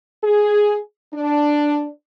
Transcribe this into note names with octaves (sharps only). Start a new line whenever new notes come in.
G#4
D4